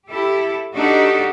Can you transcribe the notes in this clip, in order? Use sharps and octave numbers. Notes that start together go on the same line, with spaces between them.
E4 G4 A4
D4 D#4 F#4 G4 A4